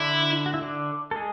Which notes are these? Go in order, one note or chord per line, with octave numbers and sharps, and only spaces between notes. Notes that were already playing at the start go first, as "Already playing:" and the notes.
Already playing: D3 D4 E4
F#4
E4
D3 D4
A4
G#3 G#4